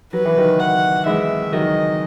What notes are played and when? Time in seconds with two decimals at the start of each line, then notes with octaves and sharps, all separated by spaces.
0.13 F#3 B4
0.25 E3
0.38 D#3 F#3
0.60 F#5
1.06 E3 G#3 E5
1.52 D#3 F#3 D#5